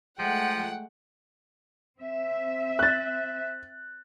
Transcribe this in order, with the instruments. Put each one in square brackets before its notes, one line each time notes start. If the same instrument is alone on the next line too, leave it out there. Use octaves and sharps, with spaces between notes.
[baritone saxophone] F3 [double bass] G#3 A3 [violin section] F#5 [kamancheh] G5
[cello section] C4 E5
[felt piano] F#6 A6